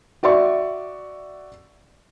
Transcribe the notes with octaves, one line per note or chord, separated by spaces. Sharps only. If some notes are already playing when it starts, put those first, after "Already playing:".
F#4 D5 E5 C#6